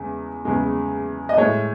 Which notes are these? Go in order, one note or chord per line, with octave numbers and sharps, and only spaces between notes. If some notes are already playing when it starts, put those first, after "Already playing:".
Already playing: E2 C#3 G#3
E2 C#3 G#3
D#5
A2 G#3 C#5